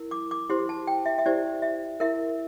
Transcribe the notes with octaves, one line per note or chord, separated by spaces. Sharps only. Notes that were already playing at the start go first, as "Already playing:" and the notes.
Already playing: E4 A#4
D6
D6
E4 G4 C5 C6
A5
G5
E5
E5
E4 G4 C5 D5
E5
E4 A#4 E5